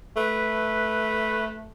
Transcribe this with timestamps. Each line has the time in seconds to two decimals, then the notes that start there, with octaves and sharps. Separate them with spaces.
0.17 A3 B4